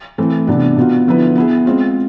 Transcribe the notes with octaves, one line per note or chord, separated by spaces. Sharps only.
E3 A3 C4
C3 E3 B3 D4
B2 B3 F4
D3 F3 B3 E4 B4
B3 E4 G#4
G#3 C4 F4